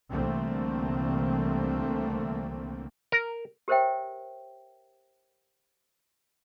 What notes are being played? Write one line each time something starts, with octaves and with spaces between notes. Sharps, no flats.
C2 D3 E3 A3 A#3 C4
A#4
G4 A#4 C5 C#5 E5 G5